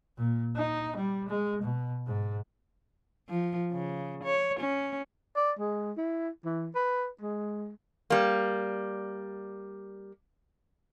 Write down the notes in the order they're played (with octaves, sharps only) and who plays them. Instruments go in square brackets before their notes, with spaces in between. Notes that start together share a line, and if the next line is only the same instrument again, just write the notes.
[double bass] A#2
D#4
G3
G#3
B2
G#2
[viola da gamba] F3
C#3
C#5
C#4
[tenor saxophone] D5
G#3
E4
E3
B4
G#3
[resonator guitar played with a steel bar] G3 A#3